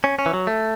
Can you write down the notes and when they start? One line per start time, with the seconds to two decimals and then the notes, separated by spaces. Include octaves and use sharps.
0.04 C#4
0.19 C#4
0.26 E3
0.33 F#3
0.47 A3